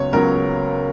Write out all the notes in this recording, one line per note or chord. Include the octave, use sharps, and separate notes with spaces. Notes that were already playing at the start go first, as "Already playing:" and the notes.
Already playing: C#2 C#3 F#3 B3 C#5
C#2 C#3 F#3 B3 A#4